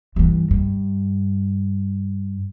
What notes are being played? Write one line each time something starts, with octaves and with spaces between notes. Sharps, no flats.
G2 E3
G2